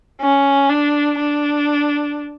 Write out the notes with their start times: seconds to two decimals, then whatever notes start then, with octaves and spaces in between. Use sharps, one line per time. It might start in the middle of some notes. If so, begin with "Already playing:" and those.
0.21 C#4
0.69 D4
1.18 D4